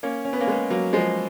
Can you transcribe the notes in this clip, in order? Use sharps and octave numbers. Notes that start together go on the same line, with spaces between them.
A#3 C#4
C#4
B3
A#3 C#4
G#3 B3
F#3 A#3
F3 G#3